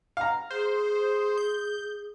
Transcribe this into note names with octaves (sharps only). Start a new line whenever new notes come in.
F5 A#5
G#4 C5
G6